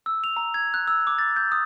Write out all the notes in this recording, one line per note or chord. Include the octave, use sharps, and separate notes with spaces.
E6
F7
A#5
G#6
F#6
E6
D6
A6
G6
D#6